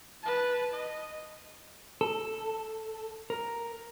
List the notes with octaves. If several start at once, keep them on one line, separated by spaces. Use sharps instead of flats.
B4 A5
D#5
A4
A#4